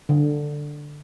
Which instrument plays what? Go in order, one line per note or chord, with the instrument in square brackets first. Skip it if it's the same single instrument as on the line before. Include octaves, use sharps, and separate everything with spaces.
[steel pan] D3